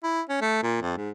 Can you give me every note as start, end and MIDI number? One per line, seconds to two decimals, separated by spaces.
0.03 0.21 64
0.29 0.39 61
0.41 0.63 57
0.63 0.77 46
0.82 0.97 41
0.97 1.10 44